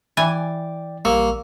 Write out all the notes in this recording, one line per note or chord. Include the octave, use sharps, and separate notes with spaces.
E3 D5 G5 G#5 A6
A#1 G3 A#3 C#6 E6